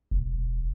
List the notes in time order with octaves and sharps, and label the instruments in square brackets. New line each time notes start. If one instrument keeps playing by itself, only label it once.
[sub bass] E1